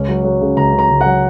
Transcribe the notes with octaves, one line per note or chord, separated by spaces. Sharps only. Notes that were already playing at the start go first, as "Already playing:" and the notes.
Already playing: C#2 C#4
F#3
F#3
C#3
C#2 A#5
C#3
A#5
C#2
F#5
F#3